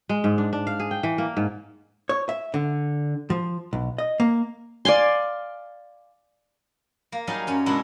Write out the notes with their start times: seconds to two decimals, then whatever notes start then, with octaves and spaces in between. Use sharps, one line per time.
0.09 G#3
0.24 G#2
0.38 D4
0.53 D4
0.67 F5
0.80 G#4
0.91 G5
1.03 E3
1.18 A#3
1.37 G#2
2.09 C#5
2.29 E5
2.54 D3
3.30 F3
3.73 B1
3.98 D#5
4.20 A#3
4.85 D5 F5 G#5 C6
7.12 A#3
7.27 F#3 G3 D#4 G#4 F5
7.47 F#2 C#4
7.66 B2 G#3 D4 E4 F#4